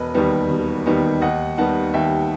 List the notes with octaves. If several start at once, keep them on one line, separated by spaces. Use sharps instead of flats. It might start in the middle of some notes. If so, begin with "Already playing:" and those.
Already playing: E1 B4 D#5
D#2 D#3 G3 B3
E1
D#2 D#3 G3 B3
D#2 D#5 F#5
D#3 G3 B3 F#5 A5
D#2 E5 G5